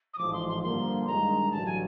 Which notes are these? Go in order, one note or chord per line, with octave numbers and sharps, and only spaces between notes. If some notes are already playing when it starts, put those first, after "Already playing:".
D#6
A1 G#2 F3 D6
C6
C6
G2 D3 F3 A#3 C6
G2 D#3 G#3 A#5
A1 G2 D3 F#3 A5
G#5